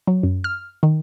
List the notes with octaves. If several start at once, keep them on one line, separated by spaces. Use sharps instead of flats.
F#3
F#2
F6
D#3